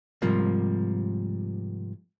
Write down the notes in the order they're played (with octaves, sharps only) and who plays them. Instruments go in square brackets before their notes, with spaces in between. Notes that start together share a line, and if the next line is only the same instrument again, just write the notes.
[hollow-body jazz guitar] G#2 C3 F3 G3 A#3